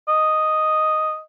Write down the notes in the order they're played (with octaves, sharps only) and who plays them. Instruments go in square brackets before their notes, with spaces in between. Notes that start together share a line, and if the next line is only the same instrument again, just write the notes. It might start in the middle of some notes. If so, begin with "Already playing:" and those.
[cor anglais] D#5